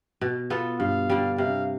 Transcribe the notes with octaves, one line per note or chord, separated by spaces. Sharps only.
B2
B3 F4 A4
G2 F5
D3 G3
C3 F5